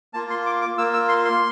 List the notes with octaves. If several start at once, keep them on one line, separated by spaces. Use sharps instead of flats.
A#3 F4 A5
C6
D6
D6
A#3 F4 E6
E6
C6
C6